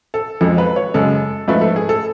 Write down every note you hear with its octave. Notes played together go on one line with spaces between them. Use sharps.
A4
F2 F3 G#3 A4
B4
C#5
F#2 C#3 G#3 A4
G#2 F3 A3 B4
A4
G#4
A4